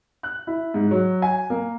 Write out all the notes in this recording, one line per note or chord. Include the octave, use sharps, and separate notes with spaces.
F#6
E4
G#2
F#3
G#5
A#3